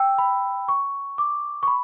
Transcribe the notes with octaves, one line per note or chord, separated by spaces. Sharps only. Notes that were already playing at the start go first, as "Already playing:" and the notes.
Already playing: G5 E6
B5
C#6
D6
C#6
B5